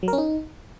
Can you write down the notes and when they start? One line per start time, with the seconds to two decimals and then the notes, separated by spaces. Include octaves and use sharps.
0.03 F#3
0.08 A#4
0.13 C#4
0.18 D#4